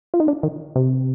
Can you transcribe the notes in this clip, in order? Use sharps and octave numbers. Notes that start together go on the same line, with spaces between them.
F4
D#4
D4
D#3
C3